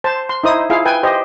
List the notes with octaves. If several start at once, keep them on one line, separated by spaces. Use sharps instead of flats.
C5 A5
C6
D#4 E4 C5 D#6
E4 F4 G#4 F5
B4 G5 G#5
G4 C5 D#5